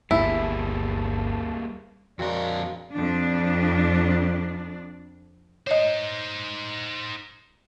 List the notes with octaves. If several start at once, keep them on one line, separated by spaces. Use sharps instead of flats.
G1 D2 G3 A#3 E4 G#4 A5
F2 G#3 C4 D4 F#4 A#4 F5
F2 D4
D#4 C5 C#5 D#5